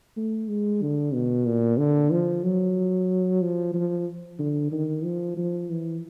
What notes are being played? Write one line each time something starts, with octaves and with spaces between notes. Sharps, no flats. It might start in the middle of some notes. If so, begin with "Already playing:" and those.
A3
G#3
D3
B2
A#2
D3
F3
F#3
F3
F3
D3
D#3
F3
F3
E3